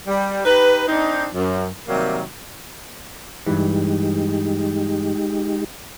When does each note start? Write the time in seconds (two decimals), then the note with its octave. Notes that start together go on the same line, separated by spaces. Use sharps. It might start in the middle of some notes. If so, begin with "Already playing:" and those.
0.07 G3
0.45 D#4 G4 B4
0.88 C4 D4 D#4
1.34 F#2
1.87 C3 D#3 F#3 G3 A#3
3.46 G2 E3 G#3 D#4 G4